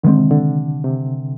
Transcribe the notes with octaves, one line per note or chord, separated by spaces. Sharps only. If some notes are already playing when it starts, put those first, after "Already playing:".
D3 D#3 G#3 C4
C3
D3
C3